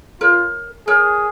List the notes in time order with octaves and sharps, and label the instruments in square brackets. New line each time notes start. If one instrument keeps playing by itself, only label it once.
[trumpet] F4 [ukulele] A#4 C#5
[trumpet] G#4 [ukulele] A#4 C#5